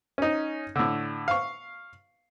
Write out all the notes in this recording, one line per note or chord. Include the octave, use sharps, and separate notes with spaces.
C#4 D#4
A2 D3
F5 C#6